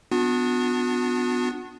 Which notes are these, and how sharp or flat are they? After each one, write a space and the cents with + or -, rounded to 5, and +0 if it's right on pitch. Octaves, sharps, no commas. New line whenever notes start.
B3 +15 D4 +0 F#4 -45